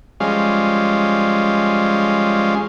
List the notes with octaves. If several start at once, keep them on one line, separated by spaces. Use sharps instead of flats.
F3 G3 G#3 C#4 F5